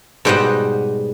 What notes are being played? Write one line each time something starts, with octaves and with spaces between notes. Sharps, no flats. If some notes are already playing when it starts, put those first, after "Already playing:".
G#2 B2 G3 C5 D#5 F#5